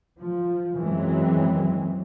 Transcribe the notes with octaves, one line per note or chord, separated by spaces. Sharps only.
F3
F#2 E3 F#3 G#3 C4